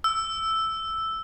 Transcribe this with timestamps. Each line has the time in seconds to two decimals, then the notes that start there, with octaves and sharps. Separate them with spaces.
0.04 E6